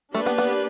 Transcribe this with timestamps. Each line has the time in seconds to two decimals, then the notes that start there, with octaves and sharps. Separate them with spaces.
0.14 A3 A#3 D4 G4 B4 D5
0.26 B3
0.38 B3